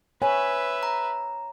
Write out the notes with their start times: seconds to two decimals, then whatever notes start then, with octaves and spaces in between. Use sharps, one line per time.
0.22 B4 C#5 E5 G#5
0.83 A#5